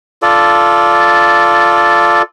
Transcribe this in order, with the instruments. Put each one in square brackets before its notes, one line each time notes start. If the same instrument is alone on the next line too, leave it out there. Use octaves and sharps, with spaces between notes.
[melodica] F4 A4 D5